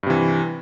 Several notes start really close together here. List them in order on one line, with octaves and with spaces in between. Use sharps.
G2 C3 E3